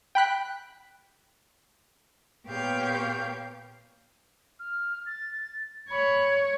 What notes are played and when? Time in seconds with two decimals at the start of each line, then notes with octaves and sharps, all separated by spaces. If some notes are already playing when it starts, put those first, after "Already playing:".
0.15 G5 B5 F#6 B6
2.48 A#2 B3 G4 C#5 F5 G6
4.60 F6
5.06 A6
5.90 C#5 B5